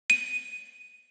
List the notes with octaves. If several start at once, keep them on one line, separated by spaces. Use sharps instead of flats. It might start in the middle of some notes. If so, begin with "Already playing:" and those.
D#7